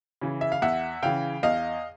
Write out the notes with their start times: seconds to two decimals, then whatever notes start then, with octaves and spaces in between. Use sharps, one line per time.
0.21 C#3 E3
0.41 E5
0.52 F5
0.62 E2 E5 F#5
1.03 C#3 E3 F5 G5
1.43 E2 D#5 F5